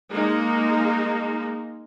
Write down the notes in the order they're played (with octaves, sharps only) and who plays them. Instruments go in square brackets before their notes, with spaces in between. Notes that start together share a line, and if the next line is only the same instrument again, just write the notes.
[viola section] G#3 A#3 D#4